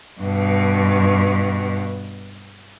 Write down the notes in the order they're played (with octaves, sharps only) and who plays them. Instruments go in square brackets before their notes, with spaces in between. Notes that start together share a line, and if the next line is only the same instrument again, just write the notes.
[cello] G2 B2